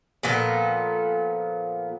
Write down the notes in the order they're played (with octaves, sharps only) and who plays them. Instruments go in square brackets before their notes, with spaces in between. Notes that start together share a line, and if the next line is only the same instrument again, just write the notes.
[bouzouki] A#2 F3 B3 A4